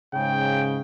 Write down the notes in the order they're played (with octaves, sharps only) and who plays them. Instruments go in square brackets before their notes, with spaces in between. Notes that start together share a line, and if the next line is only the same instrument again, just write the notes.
[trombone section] G#2 C#3 [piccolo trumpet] G5